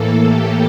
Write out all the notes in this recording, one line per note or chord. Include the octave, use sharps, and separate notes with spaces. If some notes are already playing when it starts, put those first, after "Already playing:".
Already playing: A2 E3 A#3 A4
G4